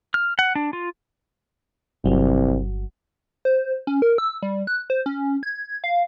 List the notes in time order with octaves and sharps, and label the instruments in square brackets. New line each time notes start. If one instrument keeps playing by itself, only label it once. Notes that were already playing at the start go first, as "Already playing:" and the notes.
[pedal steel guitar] F6
F#5
D4
F4
[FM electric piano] G1 F#3 [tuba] C2
[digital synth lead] C5
C#4
A#4
E6
G3
F#6
C5
C#4
G#6
F5